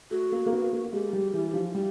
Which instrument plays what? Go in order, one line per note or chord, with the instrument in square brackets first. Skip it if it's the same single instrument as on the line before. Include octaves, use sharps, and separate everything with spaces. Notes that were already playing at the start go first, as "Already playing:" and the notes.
[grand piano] A3 [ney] F#4
[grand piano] A#3
A#3
B3
A#3
[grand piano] G#3 [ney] G4
[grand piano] G3
E3
F3
[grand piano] G3 [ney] G4